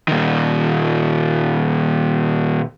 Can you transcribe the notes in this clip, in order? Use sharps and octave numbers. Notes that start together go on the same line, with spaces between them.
A#2 D#3